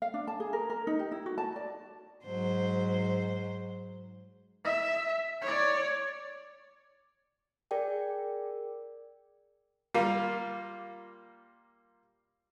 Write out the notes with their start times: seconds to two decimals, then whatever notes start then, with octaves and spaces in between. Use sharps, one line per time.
0.02 F5
0.14 D4
0.27 A5
0.40 G#4
0.53 A#4
0.70 A#4
0.87 D#4
0.99 G4
1.12 E4
1.26 F#4
1.38 A5
1.56 D5
2.25 G#2 F#3 C5
4.65 E5
5.42 C#5 D5
7.71 G#4 A#4 D5 G5
9.94 G3 A#3 F4